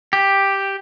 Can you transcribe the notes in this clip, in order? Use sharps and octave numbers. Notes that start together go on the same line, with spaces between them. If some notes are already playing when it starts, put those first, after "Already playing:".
G4